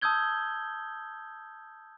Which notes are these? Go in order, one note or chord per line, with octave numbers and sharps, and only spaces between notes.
A5 D#6 E6 G6 G#6 G7